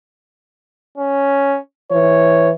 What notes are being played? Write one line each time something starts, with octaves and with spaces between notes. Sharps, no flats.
C#4
E3 C#5